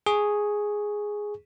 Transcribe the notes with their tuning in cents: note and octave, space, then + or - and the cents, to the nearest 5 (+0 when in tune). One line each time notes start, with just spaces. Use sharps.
G#4 +0 C#6 +0